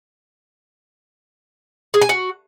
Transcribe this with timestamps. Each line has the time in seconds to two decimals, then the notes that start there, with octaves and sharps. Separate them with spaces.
1.94 G#4
2.02 G#5
2.09 F#4